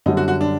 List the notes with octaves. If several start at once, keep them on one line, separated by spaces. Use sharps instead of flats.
F#2 D3 G3 D#4
F#4
F#4
D4